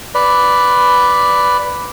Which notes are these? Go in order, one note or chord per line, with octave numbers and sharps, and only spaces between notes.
B4 D5